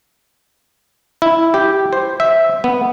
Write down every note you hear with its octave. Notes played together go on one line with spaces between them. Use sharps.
E4
G4
C5
E5
B3